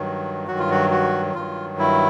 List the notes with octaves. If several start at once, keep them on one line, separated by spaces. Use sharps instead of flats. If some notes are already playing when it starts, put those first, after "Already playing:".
Already playing: G2 D#3 F#3
G2 D#3 F#3 F#4
F4
F#4
F#4
G2 D#3 F#3 F4
E4